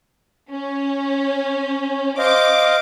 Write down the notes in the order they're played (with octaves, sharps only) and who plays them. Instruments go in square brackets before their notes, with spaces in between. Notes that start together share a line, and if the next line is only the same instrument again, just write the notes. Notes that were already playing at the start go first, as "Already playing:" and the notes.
[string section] C#4
[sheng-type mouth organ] C5 D#5 F5 [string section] D6